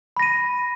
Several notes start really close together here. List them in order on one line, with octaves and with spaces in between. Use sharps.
B5 A#6 D#7